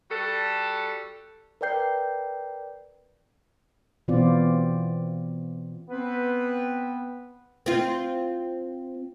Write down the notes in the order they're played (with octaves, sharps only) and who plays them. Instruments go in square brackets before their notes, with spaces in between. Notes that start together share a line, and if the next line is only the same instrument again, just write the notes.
[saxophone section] G3 F#4 A4
[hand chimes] A#4 B4 D5 G5 G6 C7
[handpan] B2 E3 B3 C4 F4 D5
[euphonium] B3 [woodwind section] C4 B4
[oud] C4 F4